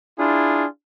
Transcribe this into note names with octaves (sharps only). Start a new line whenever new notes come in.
D4 E4 F4 G#4